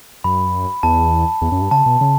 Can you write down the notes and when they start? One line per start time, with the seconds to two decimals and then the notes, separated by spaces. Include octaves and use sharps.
0.24 F#2 B5
0.83 E2 A5
1.42 E2
1.52 F#2
1.62 G2
1.71 C#3 A5
1.86 B2
2.01 C#3